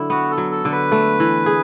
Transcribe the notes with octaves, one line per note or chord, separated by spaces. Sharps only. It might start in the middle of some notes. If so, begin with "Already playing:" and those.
Already playing: D3 F#3 E4
B3 F#4
A4
F#3
A4
D3
B4
A3
E3
G#4